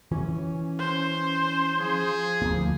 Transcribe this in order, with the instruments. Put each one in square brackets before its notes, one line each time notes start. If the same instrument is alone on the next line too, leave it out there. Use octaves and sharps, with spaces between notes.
[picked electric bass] E3 [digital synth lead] C#4
[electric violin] C5
[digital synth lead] F3 [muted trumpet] G#4
[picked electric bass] D2 A#3